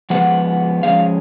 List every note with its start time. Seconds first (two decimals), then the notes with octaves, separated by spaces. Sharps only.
0.10 F3 G#3 B3 F#5
0.83 F3 G#3 C#4 F5